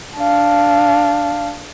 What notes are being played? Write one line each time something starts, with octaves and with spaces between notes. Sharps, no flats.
D4 F5